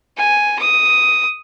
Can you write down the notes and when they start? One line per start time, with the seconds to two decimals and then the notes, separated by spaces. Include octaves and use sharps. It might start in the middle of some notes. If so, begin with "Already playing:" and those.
0.17 G#5
0.59 D#6